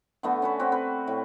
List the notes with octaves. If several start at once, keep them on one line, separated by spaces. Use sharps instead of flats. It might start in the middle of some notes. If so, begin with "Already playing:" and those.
D3 A3 B3 F#4
C#4 F#4 B4
C4 F#4 G4
C4 B4
A2